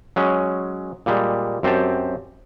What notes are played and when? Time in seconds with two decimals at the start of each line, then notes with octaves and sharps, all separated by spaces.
0.16 F#3 G#3 C#4
1.06 A#2 G3 G#3
1.63 F#2 C4 G4 A5